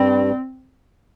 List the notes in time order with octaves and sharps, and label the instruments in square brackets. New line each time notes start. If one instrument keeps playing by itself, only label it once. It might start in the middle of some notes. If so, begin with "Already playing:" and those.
Already playing: [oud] G2 G3 [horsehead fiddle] C4